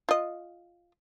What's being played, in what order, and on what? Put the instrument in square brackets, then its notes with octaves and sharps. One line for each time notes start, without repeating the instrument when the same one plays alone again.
[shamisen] F4 D#5